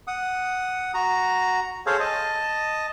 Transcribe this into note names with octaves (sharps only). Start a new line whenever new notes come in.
F#5 D#6
F#4 A#5
G#4 A4 C5 C#5 F5
D#5 A5